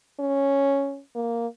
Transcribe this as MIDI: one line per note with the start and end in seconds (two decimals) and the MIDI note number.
0.20 1.00 61
1.15 1.47 58